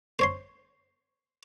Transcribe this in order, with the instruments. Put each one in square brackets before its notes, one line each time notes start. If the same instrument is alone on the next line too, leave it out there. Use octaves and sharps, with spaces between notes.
[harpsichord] C5 C#5 C6